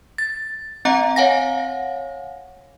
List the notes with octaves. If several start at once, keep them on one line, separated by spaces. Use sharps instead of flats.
A6
C4 D#5 F#5 A#5
C#5 F5 F#5 G#5 A#6